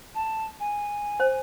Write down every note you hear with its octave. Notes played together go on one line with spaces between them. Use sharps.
A5
G#5
C5